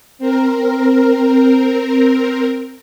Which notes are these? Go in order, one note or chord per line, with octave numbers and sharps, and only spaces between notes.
C4 A#4